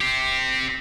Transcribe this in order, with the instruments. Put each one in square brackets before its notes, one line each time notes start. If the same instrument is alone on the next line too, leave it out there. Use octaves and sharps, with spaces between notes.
[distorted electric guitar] C4 G4